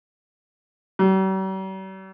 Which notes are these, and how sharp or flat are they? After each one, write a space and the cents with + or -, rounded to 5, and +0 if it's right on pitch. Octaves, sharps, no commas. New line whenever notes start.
G3 -45